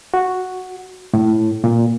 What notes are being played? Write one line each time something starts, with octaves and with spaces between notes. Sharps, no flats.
F#4
A2
A#2